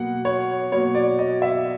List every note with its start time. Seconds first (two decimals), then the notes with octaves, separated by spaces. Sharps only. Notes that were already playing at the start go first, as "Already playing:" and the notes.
Already playing: B2 F#3 A#3 F#5
0.25 C#5
0.72 B2 F#3 A#3 C#5
0.95 D5
1.19 D#5
1.42 E5